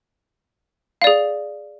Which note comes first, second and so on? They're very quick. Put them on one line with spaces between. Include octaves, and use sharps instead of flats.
F5 D5 G#4